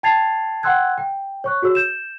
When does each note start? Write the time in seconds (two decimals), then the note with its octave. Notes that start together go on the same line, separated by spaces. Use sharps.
0.03 G5 A5 G#6 A6 C7 F7
0.63 F#5 G5 C6 E6 F#6 G#6
0.98 G5
1.44 C#5 C#6 F#6
1.62 F#4 G#4 C#5 E6
1.75 G6 E7